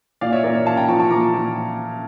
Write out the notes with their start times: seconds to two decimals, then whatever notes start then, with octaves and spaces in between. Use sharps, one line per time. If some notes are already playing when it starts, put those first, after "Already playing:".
0.21 A#2 D5 F5
0.32 C#5 E5
0.44 A#2 A#4 D5
0.55 C#5 E5
0.66 C#4 F5 A5
0.77 G5 A#5
0.88 F3 A5 C#6
1.00 A5 C#6
1.10 A#2 A#5 D6
1.33 A#2